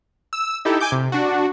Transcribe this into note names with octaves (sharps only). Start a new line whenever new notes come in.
E6
D#4 E4 G4 A4
G#5 D6 G6
C3
D4 F#4